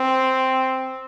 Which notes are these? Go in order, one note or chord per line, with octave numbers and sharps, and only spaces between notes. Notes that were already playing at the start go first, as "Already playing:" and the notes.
Already playing: C4